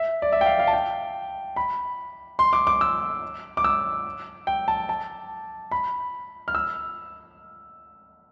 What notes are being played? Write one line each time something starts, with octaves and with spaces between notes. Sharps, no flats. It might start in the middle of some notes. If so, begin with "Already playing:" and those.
Already playing: E5
D5
E5
G5
F5
F5
A5
G5
B5
C6
D6
D6
E6
D6
E6
G5
A5
A5
B5
F6
E6